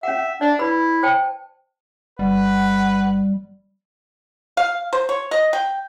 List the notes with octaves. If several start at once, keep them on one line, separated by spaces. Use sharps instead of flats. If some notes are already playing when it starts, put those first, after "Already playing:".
C#4 E5 F#5
D4 D5
E4 B4 B5
C5 G5 A5
G1 G3 B4 F#5
F5
C5
C#5
D#5
G5